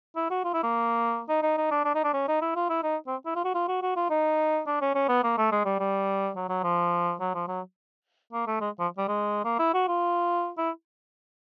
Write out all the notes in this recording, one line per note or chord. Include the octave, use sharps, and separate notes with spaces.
E4
F#4
F4
E4
A#3
D#4
D#4
D#4
D4
D4
D#4
D4
C#4
D#4
E4
F4
E4
D#4
C4
E4
F4
F#4
F4
F#4
F#4
F4
D#4
D4
C#4
C#4
B3
A#3
A3
G#3
G3
G3
F#3
F#3
F3
F#3
F3
F#3
A#3
A3
G#3
F3
G3
G#3
A#3
E4
F#4
F4
E4